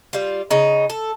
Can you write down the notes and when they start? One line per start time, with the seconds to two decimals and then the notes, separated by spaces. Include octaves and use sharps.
0.13 G3 F4
0.51 C#3 D#4
0.90 A4